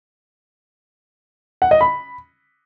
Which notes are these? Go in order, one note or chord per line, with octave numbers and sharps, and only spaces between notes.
F#5
D#5
B5